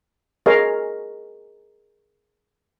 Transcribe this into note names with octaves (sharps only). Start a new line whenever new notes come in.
G#4 A#4 C#5 D#5 F5